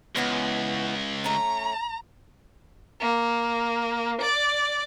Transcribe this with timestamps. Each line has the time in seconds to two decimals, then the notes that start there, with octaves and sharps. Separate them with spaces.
0.16 C#2 E3 B3 C#4
1.24 A3 C#4 A#5
3.01 A#3
4.21 D5